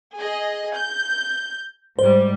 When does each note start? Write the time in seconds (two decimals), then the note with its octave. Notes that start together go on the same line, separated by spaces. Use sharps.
0.18 G#4 D#5
0.76 G6
1.99 G#2 G3 C5